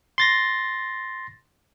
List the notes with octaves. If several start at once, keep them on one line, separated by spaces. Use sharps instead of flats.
C6 A6 A#6